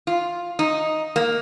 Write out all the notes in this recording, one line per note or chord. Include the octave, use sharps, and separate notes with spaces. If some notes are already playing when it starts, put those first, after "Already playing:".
F4
D#4
A#3